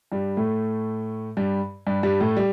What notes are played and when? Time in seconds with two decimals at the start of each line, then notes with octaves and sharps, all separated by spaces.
0.12 G2 G3
0.37 A2 A3
1.37 G2 G3
1.87 G2 G3
2.03 G2 G3
2.20 A2 A3
2.37 G3